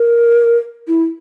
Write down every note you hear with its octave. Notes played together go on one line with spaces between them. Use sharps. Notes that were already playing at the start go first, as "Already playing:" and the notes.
Already playing: A#4
E4